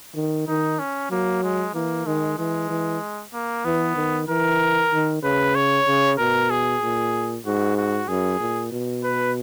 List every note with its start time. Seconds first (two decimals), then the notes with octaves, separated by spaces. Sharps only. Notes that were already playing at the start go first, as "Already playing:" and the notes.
0.16 D#3
0.48 D#3 D#4
0.79 C#4
1.11 F#3 A#3
1.43 G#3
1.75 E3 A#3
2.06 D#3 G#3
2.38 E3 G#3
2.69 E3
3.34 A#3
3.65 E3 B3
3.96 D#3
4.28 E3 A#4
4.92 D#3
5.23 C#3 B4
5.55 C#5
5.87 C#3
6.18 B2 A#4
6.50 G#4
6.82 A#2
7.46 G#2 F#4
7.77 F#4
8.08 F#2 G#4
8.40 A#2
8.72 B2
9.04 B4